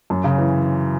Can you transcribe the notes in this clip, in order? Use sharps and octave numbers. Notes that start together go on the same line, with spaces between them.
F#2
C#3
E3